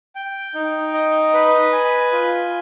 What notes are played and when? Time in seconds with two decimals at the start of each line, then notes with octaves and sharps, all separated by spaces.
0.15 G5
0.55 D#4
0.94 D#5
1.34 B4
1.73 G#5
2.12 F4